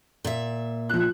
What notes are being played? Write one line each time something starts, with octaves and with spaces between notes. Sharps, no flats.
A#2 E5
F3 F#6